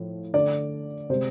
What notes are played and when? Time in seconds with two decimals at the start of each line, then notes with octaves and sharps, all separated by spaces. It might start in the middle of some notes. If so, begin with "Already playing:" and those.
Already playing: A2 F3 A3
0.34 D3 A3 D5
1.10 C3 G#3 C5